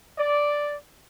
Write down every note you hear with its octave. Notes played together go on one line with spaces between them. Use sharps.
D5